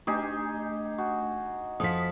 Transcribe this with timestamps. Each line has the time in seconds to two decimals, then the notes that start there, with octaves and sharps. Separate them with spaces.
0.07 A3 D4 D#4 G4 G#4
0.98 F#4 G#4
1.80 F2 F3 D#6 B6